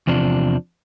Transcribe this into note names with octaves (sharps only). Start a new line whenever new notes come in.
E2 C3 F3 D4